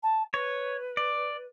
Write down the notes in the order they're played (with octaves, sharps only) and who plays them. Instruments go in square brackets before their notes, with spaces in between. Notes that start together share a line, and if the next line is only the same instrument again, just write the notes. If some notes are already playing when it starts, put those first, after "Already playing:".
[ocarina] A5
[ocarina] B4 [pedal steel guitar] C#5
[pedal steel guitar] D5